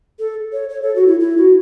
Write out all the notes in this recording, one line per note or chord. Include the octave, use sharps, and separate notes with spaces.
A4
C#5
C#5
A4
F#4
E4
E4
F#4